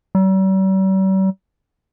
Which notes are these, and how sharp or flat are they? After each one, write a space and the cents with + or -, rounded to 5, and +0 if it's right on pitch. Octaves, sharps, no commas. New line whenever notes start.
G3 -45